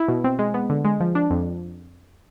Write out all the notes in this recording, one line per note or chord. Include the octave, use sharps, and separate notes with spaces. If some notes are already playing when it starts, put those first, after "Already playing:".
Already playing: E4
B2
C4
G#3
B3
D3
G#3
F3
D4
F2